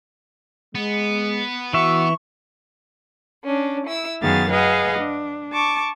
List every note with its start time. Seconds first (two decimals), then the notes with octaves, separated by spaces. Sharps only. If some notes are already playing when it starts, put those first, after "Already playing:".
0.75 G#3 B3
1.73 E3 F#4 E5 C#6
3.44 C#4 D4
3.86 E4 E6
4.21 F#2 D#3 B3 G#4 F5 A6
4.50 G#4 B4 D#5 F5 F#5
4.99 D4
5.52 A5 C#6 D6